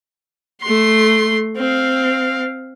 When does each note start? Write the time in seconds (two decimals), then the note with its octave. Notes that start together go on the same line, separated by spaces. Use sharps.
0.62 A3 C6
1.57 C4 F5